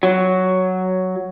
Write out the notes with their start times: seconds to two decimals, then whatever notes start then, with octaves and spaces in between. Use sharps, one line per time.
0.03 F#3